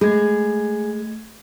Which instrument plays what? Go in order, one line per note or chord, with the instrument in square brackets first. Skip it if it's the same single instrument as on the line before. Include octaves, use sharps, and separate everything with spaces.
[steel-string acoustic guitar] G#3 [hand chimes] A3 G#6 [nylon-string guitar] G#4